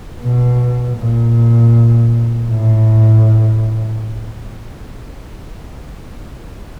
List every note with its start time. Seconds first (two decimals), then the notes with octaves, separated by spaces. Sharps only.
0.22 B2
0.97 A#2
2.48 A2